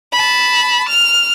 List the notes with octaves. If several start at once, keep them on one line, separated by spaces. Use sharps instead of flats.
A5 B5
F6